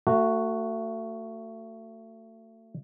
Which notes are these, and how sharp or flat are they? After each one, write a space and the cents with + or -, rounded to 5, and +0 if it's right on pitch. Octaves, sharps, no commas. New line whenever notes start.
A3 +30 F#4 +0